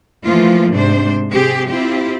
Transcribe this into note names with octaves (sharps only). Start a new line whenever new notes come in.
E3 F3 A3 A#3 F4
G#2 C3 D4 C5
C3 C4 G4 G#4
C4 E4 F4 G4